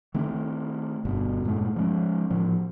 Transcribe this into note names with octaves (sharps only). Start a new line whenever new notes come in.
D#3 A3 C4
G1 G2 B2
G2 A#2 G#3 A3
F3 G#3 C#4
A2 F3